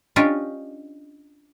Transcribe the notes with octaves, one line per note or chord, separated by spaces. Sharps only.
C#4 D4 F4 G4 D#5 G5